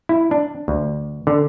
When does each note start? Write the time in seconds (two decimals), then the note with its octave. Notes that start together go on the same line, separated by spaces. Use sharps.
0.09 E4
0.31 D4
0.68 D2
1.27 D3